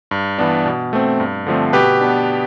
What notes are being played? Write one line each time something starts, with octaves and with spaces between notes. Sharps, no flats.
G2
E3 B3 D4
B2
A3 C4
G2
D3 F3 A3 C4
B2 G4 B4
B3 D4